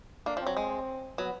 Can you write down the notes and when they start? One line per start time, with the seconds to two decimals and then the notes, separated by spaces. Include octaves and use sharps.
0.26 A#3 D4
0.37 F3
0.42 C4
0.47 F#3
0.57 G#3
1.18 F#3 B3